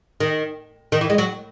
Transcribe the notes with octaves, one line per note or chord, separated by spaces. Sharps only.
D#3
D#3
E3
G#3
F#3